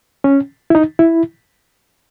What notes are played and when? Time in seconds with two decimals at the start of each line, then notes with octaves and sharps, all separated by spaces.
0.24 C#4
0.70 E4
0.75 D#4
0.99 E4